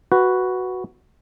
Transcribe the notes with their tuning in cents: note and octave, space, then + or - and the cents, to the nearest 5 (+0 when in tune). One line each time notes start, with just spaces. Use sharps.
F#4 +0 B4 +0